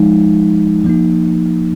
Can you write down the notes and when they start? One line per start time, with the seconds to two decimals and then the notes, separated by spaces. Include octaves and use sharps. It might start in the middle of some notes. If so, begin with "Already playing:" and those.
Already playing: F3 G#3 D#4
0.85 F3 A#3 D#4